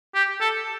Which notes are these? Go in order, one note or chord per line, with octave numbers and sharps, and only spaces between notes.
G4
A4